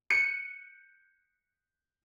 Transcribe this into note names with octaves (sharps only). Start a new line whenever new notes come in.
F#6 G6 C#7 D#7